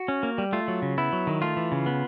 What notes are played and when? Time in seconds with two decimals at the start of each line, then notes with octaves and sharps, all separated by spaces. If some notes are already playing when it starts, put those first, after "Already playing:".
Already playing: F#4
0.08 C#4
0.23 A#3
0.38 G3
0.53 A3 F4
0.68 F#3
0.82 C#3
0.98 B3 E4
1.13 F#3
1.27 D#3
1.42 A3 F4
1.57 E3
1.72 C#3
1.86 B3